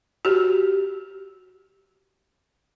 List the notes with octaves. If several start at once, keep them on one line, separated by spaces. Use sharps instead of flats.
F#4 G4